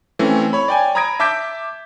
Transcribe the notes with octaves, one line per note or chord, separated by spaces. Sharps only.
E3 A3 C4 C#4
C#5 B5
D5 G5 G#5
A#5 B5 D#6 G#6 A#6 D7
E5 A5 D6 G6 B6 D7